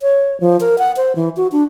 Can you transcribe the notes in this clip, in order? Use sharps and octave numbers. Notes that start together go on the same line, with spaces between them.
C#5
F3
A#4
F#5
C5
E3
F#4
D4